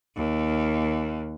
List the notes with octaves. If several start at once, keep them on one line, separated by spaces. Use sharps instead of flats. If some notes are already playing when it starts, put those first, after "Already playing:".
D#2